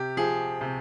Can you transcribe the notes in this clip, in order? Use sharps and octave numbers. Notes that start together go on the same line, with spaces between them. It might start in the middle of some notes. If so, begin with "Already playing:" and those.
Already playing: C3 G4
F3 G#4
C3